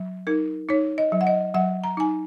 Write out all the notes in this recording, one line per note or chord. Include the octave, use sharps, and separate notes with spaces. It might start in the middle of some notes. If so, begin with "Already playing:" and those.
Already playing: F#3
D#4 A#4
D#4 C#5
D#5
F#3
F#5
D#5
F#3 F#5
A#5
D#4 G#5